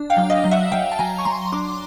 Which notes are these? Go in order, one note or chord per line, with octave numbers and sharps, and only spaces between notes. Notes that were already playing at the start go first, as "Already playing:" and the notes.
Already playing: D4
F5 G5
F#3
D#5 F5
F#3
E5 F#5
F#3 F5 G5
A5
F#3 G#5 A#5
C#6
F#3 A#5 C6
D4 C6 D6